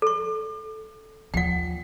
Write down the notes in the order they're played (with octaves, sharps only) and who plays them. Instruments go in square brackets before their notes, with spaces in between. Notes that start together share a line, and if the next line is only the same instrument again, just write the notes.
[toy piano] A4 C#6
[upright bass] D#2 F3 [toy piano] F#5 G5